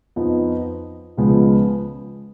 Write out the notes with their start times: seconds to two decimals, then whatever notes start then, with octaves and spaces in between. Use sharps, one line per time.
0.16 F2 F3 B3 D#4
1.17 C#2 C#3 F3 G#3 B3